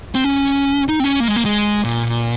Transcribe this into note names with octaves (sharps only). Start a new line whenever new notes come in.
C4
C#4
D#4
C4
C#4
A#3
G#3
A#3
G#3
A#2